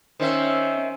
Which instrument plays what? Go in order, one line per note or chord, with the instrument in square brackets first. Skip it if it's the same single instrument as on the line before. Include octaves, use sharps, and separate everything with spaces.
[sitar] D#3 E5 [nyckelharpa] C#4 C5